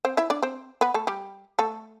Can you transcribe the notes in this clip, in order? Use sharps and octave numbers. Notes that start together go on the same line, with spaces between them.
C4 C5
E4 E5
D4 D5
C4 C5
B3 B4
A3 A4
G3 G4
A3 A4